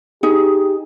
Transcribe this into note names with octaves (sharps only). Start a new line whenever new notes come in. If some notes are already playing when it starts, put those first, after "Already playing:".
D#4 G4 G#4